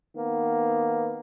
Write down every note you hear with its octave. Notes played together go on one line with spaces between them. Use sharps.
D#3 A#3 B3